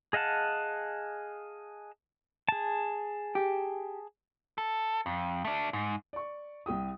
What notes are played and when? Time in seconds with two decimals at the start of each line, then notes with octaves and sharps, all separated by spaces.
0.13 G#4 D#5 F5 F#5 A5
2.49 G#4 A5
3.35 G4
4.58 A4
5.06 F2
5.45 A3 D4
5.73 G#2
6.13 D5 C#6
6.66 C2 G4 G5 D#6